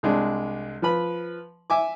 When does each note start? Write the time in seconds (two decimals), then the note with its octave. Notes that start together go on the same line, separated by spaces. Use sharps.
0.03 C2 G#3 D4
0.82 F3 B4 B5
1.70 E5 G#5 D6